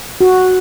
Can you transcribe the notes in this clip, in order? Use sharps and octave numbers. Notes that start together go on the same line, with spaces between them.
F#4